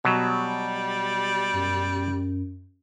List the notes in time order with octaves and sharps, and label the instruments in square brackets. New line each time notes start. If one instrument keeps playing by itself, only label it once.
[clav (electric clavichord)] B2 F#3 [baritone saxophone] G3
[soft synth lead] F#2